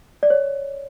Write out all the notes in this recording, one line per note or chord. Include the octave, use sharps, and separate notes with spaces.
D5
C#5